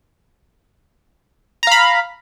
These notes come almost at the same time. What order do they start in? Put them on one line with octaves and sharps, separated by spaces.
A#5 F5 B5